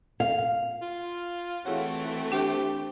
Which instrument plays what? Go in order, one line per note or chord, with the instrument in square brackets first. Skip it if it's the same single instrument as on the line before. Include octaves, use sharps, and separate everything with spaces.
[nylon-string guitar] F5
[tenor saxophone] F4
[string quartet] E3 A3 C4 [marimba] E4 G#4 C#5 [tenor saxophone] F#4
[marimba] D4 C5 [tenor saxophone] G4